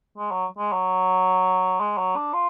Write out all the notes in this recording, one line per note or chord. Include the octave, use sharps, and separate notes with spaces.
G#3
F#3
G#3
F#3
G#3
F#3
D4
F4